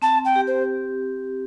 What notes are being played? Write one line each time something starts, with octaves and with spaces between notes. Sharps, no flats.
C4 A5
G5
G4
C5